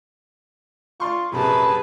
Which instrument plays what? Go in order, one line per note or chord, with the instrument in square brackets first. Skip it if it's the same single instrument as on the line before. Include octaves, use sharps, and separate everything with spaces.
[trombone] F4 [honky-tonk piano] D5 C6 C#6
[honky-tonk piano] A#1 C3 [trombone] F#2 [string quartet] G#4 B4 A5 [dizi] B5